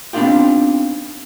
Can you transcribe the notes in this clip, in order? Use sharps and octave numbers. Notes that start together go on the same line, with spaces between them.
B3 C4 D4 D#4 F4 G4